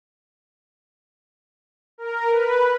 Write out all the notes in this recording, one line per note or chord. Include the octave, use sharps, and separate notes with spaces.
A#4
B4